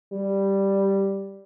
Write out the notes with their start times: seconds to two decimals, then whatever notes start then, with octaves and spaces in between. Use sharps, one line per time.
0.13 G3